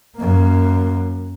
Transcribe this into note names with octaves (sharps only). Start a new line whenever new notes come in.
F#2 A#3